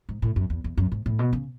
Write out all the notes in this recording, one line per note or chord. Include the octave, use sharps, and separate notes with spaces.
G#2
A2
F#2
E2
E2
F#2
G#2
A2
B2
C#3